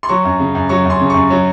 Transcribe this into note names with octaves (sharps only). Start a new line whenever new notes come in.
C6
F#3 C#6
F#2
C#3
F#2
F#3 C#6
F#2
C6
C#3
F#2 C#6
F#3